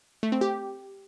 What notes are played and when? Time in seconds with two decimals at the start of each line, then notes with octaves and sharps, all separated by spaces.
0.23 A3
0.32 C4
0.41 G4